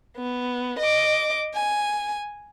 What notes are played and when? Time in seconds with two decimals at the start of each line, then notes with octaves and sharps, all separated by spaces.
0.17 B3
0.79 D#5 D6
1.55 G#5